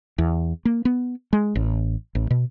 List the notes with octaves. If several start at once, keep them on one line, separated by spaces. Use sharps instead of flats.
E2
A#3
B3
G#3
A1
A1
B2